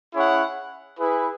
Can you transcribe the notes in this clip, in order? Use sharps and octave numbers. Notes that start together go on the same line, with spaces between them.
C#4 E4 G#4 C#5 F#5
E4 G#4 B4